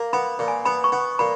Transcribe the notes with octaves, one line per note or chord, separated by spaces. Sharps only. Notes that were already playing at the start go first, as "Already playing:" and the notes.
Already playing: A#3
B3 B5
A#2
G#5
B3 B5
C#6
B3
A#2 B5